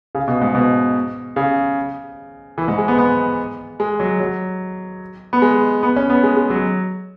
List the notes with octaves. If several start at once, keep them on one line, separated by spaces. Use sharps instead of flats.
C#3
B2
G#2
B2
C#3
E3
G#2
G#3
B3
B3
G#3
F#3
F#3
B3
G#3
B3
C#4
B3
G#3
G#3
F#3